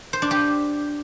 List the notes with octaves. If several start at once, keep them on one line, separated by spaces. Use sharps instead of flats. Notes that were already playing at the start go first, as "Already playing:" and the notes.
C5
D4
G4